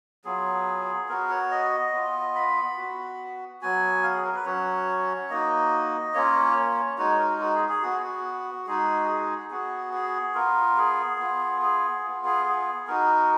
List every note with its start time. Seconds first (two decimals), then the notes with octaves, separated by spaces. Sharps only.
0.25 F#3 B3 F4 G#4
1.09 B3 F#4 A#4
1.30 C#5
1.51 D#5
1.93 B3 F4
2.35 B5
2.77 B3 F#4
3.61 F#3 B3 F#4 G#5
4.03 F5
4.14 G#4
4.25 A#4
4.35 B4
4.45 F#3 C#4 F#4 C#5
5.30 A#3 D#4 F#4 D#5
6.14 A#3 C#4 F4 C#5
6.56 C#5
6.98 G#3 D#4 F#4 C#5
7.19 A#4
7.40 F#4
7.54 G#4
7.69 G#4
7.82 B3 F#4
7.92 G#4
8.03 F#4
8.67 G#3 D#4 F#4 G#4
9.09 G#4
9.50 B3 F#4 G#4
9.93 G#4
10.35 B3 F4 A#4
10.77 G#4
11.19 B3 F4
11.62 G#4
12.03 B3 F4
12.25 G#4
12.46 G#4
12.87 B3 D#4 F#4 A#4